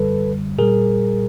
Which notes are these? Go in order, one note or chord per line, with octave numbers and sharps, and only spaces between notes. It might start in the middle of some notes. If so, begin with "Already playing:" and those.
Already playing: F#2 D3 G3 A4 B4
A#2 G3 G#4 A#4